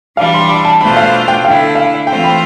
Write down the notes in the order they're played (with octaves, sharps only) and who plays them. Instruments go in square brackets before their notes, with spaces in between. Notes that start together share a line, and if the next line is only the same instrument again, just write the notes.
[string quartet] E3 G3 D4 [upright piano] F5
[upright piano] C6
B5
A5
[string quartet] B2 A3 D4 F4 C5 [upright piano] B5
[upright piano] F5
G5
[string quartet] D3 A3 E4 [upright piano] F5
[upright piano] F5
[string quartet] E3 A3 C4 F4 C5 [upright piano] G5
[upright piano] B5